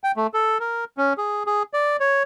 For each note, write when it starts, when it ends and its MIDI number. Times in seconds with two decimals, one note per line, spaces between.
0.04 0.12 79
0.16 0.27 57
0.34 0.58 69
0.60 0.84 70
0.97 1.13 61
1.18 1.43 68
1.47 1.63 68
1.73 1.97 74
2.00 2.23 73